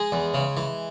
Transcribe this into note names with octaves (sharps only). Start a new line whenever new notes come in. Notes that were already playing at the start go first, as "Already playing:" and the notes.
Already playing: G#3 G#4
E2
C#3
E3